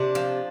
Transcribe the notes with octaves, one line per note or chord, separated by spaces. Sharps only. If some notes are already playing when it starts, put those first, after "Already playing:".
Already playing: C3 D4
F3